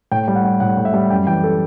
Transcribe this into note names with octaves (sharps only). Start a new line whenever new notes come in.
A2 G5
G3
F#5
G3
A2 F#5
A2
E5
G3
F#2 G5
E3 G5
A4